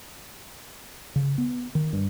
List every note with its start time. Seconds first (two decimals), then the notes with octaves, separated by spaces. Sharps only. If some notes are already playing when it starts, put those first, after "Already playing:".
1.16 C#3
1.38 B3
1.75 D#3
1.93 G2